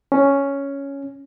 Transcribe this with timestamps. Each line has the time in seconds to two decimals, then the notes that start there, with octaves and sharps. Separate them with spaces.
0.12 C#4